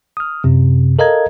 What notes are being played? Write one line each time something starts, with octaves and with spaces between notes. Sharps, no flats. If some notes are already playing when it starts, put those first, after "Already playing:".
D#6 F6
F#2 C3
A4 A#4 D#5 F5 A#5 G#6